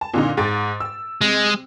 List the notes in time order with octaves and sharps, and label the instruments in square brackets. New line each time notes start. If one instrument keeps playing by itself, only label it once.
[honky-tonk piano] A5
A#2 D3 D#4
G#2 A6 D7
E6
[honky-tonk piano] C3 [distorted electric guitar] G#3